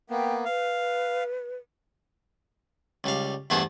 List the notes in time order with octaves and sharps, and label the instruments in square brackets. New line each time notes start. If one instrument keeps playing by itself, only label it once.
[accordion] A#3 B3 [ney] G5
[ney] B4 [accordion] F5
[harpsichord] C#2 G3 F5
E2 G2 A3 B3 G#4 C5